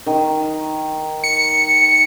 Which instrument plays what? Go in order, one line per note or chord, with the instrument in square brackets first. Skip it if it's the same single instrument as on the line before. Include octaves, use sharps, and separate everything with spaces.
[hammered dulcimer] D#3
[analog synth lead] C#7